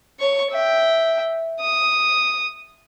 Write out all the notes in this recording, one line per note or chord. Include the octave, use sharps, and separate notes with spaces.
C#5 C#6
E5 G5
D#6